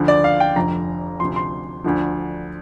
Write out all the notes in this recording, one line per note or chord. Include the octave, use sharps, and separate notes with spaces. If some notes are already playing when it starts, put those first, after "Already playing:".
Already playing: D2 D3 F3
D5
F5
G5
F1 F2 D3 A#5
D2 C3 F3 C6
C6
D2 D3 F3